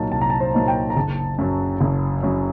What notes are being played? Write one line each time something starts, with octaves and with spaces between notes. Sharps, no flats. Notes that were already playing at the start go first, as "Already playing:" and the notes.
Already playing: C2 A#2 F#3 A#3 D#4 A5
C2 A5
A#5
A5
C5
A#2 F#3 A#3 D#4
G5
A#5
F#1 A5
F#2 F#3
F#1
F#2 F#3